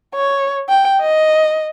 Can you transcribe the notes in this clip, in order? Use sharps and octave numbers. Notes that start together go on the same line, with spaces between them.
C#5
G5
D#5